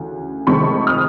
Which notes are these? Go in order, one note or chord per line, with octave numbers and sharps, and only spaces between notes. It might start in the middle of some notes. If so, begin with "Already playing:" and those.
Already playing: D2 C#3 E3
F1 F2 C3 D#3 G#3 B5 C#6
D#6 F6